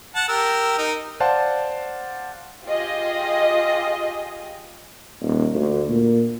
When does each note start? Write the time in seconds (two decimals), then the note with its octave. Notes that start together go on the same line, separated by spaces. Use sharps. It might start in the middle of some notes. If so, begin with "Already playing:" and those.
0.15 F#5 A5
0.28 G4 A#4 E6
0.78 D#4 A#4
1.20 C5 D5 F5 F#5 A5 C6
2.64 F4 G4 G#4 D#5
5.21 D#1
5.55 D2
5.89 A#2